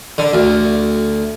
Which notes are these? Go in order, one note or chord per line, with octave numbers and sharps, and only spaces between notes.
D3
D2